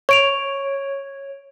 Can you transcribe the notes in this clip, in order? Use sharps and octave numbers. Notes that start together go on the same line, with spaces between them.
C#5 C#6 D7 F7